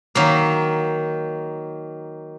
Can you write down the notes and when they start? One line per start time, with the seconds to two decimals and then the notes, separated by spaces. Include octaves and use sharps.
0.15 D#3 F#3 A#3